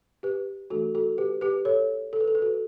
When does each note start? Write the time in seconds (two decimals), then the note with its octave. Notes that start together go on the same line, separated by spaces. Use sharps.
0.23 G4 B4
0.70 E3 A3 D4 F#4 A4
0.95 F#4 A4
1.18 G4 B4
1.41 G4 B4
1.65 A4 C#5
2.13 A4
2.20 B4
2.28 A4
2.35 B4
2.42 F#4 A4